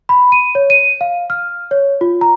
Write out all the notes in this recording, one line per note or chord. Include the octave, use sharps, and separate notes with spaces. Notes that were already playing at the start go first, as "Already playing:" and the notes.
B5
D#7
C#5
D#7
F5
F6
C#5
F4
A#5